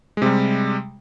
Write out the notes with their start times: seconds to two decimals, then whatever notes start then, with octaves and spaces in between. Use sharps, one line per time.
0.17 G#3
0.22 C3
0.26 G3